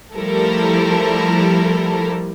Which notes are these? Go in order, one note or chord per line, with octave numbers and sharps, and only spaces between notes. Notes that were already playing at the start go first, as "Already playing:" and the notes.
F3 G3 A3 E4 A4 A#4